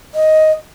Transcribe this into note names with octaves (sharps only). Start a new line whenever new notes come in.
D#5